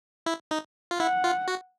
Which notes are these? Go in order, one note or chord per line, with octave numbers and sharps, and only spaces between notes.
E4
D#4
F4
E4 F#5
F4
F#4